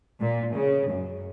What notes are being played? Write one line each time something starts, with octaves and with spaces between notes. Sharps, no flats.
A#2
C#3
F#2